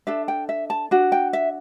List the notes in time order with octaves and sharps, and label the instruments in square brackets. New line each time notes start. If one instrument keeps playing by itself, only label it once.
[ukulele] D4 A4 E5
G5
E5
A5
D4 F#4
G5
E5